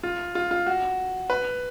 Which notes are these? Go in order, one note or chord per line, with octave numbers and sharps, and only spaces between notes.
F4
F4
F4
F#4
B4